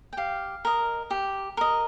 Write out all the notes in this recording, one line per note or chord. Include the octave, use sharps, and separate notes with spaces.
G5
G4 F5
A#4 D#5
G4
A#4 D#5